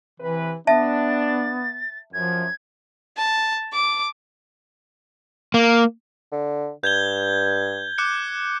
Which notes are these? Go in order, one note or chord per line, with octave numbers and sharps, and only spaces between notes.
C3 E3 B4
B3 D4 E5 A5 A6
F#2 F3 G#6
A5
D6
A#3
D3
G2 G6 G#6 G7
D6 F#6 C#7